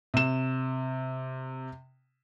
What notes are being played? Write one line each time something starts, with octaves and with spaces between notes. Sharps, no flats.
C3 E7